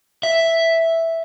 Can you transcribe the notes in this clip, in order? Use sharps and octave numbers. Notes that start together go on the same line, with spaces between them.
E5